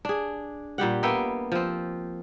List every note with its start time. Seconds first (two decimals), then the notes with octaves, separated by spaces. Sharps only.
0.05 D4 G#4
0.78 A#2 G3 G4 F#5
1.03 A#3 B3 E5 G5
1.52 F3 C4